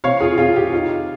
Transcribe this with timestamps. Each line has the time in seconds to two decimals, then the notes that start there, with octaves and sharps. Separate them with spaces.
0.04 C3 C#5 F5
0.21 F4 G#4
0.38 C3 F4 G#4
0.56 G4
0.72 D#4 F4